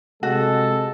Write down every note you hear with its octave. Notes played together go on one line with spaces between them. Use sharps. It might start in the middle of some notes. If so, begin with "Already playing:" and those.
C3 G#3 F#4 A4